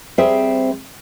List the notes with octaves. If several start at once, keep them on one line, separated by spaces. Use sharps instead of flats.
G3 C4 G#4 C5 E5